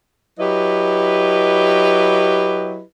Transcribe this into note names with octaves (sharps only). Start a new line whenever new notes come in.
F#3 E4 G4 B4 D#5